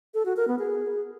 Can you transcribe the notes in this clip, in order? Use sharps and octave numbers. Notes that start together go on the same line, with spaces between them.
A4
F#4
A#4
B3
G#4